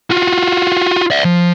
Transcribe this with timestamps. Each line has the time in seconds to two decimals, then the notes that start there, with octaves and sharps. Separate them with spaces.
0.10 F4 F#4
1.10 D5 E5
1.25 F3